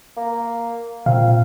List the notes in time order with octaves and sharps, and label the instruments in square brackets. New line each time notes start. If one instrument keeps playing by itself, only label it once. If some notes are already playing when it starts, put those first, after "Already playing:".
[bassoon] A#3
[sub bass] A#2 [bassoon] C4 [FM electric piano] F5